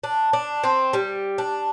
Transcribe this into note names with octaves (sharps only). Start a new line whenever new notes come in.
D4
D4
C4
G3
D4